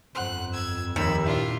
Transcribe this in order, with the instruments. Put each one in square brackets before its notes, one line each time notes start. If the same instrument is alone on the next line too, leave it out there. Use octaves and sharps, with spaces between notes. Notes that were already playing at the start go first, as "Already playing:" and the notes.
[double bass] G1 F2 [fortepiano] C5 F#5 C6 [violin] F#6
[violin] E6 G#6
[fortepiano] A#1 F3 [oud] D#2 [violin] B5 E6
[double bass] A#2 [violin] D4 F4 [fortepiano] E4 E5